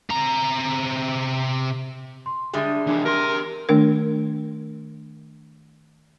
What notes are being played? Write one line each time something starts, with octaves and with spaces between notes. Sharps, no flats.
C3 A#5
C6
D3 G3 G#3 G#4 E5
E3 D4
G4 A#4 C6
D#3 A3 D4 A#4